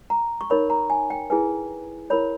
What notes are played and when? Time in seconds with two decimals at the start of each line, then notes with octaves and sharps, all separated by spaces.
0.10 A#5
0.41 C#6
0.50 D#4 A#4 C#5 B5
0.70 A#5
0.90 G#5
1.10 G5
1.30 E4 G#4 B4 G#5
2.10 E4 A#4 C#5 B5